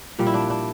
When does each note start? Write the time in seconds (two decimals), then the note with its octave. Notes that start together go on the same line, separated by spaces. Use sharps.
0.18 A#2 F3 G3
0.26 E4
0.34 D4
0.50 D4